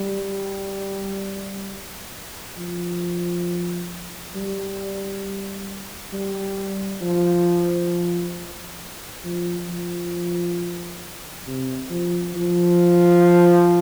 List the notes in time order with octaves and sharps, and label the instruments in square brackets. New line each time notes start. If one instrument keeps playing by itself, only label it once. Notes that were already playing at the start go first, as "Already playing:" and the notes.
Already playing: [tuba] G3
F3
G3
G3
F3
F3
F3
C3
F3
F3